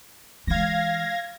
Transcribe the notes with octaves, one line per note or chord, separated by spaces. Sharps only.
E3 G#3 F5 G#6 A#6